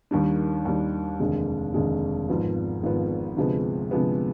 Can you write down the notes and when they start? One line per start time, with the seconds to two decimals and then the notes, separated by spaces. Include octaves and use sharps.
0.11 D#2 D#3 G3 D4
0.65 D#2 D#3 G3 D4
1.20 F1 D#2 D3 G#3
1.74 F1 D#2 D3 G#3
2.29 G#1 G#2 F3 B3 F4
2.83 G#1 G#2 F3 B3 F4
3.37 D2 C3 F3 G#3 B3
3.91 D2 C3 F3 G#3 B3